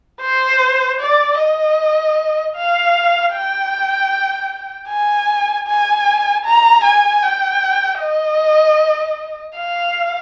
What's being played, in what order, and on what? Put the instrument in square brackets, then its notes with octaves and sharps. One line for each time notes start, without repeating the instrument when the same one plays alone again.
[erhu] C5
D5
D#5
F5
G5
G#5
G#5
A#5
G#5
G5
D#5
F5